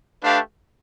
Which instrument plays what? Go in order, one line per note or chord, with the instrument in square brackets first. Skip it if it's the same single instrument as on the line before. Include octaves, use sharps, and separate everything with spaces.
[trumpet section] A3 D4 G4 B4 F5